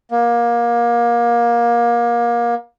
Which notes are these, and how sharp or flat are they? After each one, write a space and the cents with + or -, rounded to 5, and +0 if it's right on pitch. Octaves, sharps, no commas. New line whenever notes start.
A#3 +25